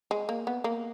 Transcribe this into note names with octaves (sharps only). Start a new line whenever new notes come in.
G#3
A#3
B3
A#3